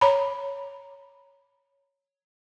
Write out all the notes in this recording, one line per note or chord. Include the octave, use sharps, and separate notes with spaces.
C#5 A#5 B5